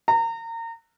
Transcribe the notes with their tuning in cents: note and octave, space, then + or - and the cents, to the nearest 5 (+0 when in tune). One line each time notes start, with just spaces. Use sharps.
A#5 -30